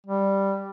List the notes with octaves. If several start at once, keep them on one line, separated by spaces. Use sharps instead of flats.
G3